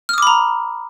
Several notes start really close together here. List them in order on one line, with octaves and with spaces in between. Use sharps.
F6 D#6 D6 B5 A#5